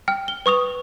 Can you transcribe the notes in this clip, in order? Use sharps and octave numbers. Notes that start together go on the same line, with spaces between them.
G5 F6
G7
B4 C#6 D#6 F7